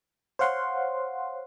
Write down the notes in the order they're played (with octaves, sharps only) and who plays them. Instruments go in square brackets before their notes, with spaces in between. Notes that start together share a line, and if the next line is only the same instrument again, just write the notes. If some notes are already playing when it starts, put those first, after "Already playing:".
[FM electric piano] C5 C#5 F5 F#5 C6